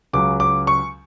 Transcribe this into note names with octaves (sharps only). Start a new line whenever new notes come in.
C#2 C#3 F#3 D6
D6
C#6